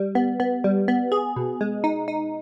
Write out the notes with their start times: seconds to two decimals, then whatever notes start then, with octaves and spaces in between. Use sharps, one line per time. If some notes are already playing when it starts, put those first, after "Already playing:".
Already playing: G3
0.15 B3
0.40 B3
0.64 G3
0.88 B3
1.12 G#4
1.36 B2
1.61 G#3
1.84 D#4
2.08 D#4